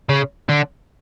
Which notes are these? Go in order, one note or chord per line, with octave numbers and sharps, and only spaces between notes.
C#3
D3